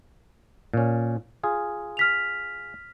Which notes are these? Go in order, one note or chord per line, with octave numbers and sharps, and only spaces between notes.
A#2 C#4
F4 G#4
F6 B6 F7